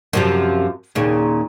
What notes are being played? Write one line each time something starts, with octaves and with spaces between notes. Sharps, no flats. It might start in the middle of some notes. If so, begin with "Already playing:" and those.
F#2 C3 F3
D#2 A#2 C#3